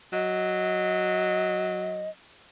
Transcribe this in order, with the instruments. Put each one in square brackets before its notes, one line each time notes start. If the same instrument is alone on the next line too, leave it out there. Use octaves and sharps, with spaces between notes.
[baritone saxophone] F#3 [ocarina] D#5